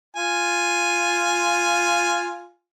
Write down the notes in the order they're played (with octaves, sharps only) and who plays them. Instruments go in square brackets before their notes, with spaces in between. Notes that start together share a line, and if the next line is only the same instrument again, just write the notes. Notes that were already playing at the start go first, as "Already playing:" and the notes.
[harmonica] F4 G#5